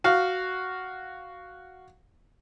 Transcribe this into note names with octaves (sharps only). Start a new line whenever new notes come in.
F#4 F5